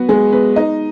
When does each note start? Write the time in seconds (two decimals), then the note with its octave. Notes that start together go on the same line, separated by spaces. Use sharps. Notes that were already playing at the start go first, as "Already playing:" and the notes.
Already playing: F#3 B3 F#4 B4
0.09 G#3 G#4
0.32 B3 B4
0.56 D#4 D#5